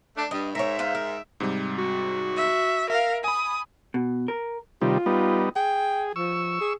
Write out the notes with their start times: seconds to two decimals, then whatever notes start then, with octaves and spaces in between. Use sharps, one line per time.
0.16 A3 D4
0.31 G2 D#5
0.55 G#2 A#4 C#5 E5
0.79 B4 C5 F5
0.95 A#4
1.40 G#2 C3 G3
1.78 F#4
2.37 E5
2.90 A#4 E5 F5
3.24 G#5 B5 D#6
3.94 B2
4.28 A#4
4.81 C3 D#3 G3 F4
5.06 G3 B3 D#4
5.56 G#4 G5
6.16 F3 C#6 E6
6.61 G#4